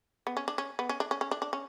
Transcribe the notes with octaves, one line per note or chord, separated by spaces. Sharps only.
B3
C#4
D4
C#4
B3
C#4
D4
C#4
C#4
D4
D4
C#4